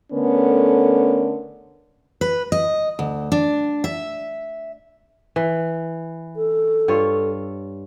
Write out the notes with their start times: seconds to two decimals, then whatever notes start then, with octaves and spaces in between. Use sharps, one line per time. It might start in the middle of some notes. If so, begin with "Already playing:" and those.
0.12 D3 A3 B3 C#4 A#4
2.21 B4
2.52 D#5
2.99 D2
3.32 D4
3.84 E5
5.36 E3
6.36 A4
6.88 G2 F4 C#5